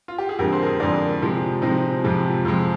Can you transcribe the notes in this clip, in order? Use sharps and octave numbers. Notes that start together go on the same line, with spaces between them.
F4
G4
G#4
F2 D3 G#3 G4 A#4
G#4 C5
A#4
G#4 C5
F2 D3 G#3 A#4 D5
C3 F3 G#3
C3 F3 G#3 C4 D#4
F2 C3 F3 G#3
F2 C3 F3 G#3